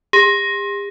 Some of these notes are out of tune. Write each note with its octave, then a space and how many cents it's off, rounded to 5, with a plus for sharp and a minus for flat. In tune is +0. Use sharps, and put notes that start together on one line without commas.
G4 +45